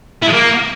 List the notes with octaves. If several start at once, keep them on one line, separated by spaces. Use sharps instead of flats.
E4
G#3
A#3